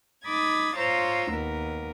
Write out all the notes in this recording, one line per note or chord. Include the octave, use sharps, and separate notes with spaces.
D#4 B5 D6 D#6 G#6 A6
F4 C5 C#5 A#5 E6
D#2 B3 A#4